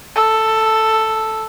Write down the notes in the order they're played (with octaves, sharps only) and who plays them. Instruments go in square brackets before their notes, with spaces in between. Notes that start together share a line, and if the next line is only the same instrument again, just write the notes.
[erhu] A4